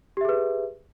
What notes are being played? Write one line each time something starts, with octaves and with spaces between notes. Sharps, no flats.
G4 G#4 B4 E5